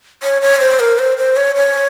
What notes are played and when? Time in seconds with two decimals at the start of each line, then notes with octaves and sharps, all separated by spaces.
0.23 C#5
0.42 C#5
0.60 C5
0.79 A#4
0.98 C5
1.18 C5
1.36 C#5
1.55 C#5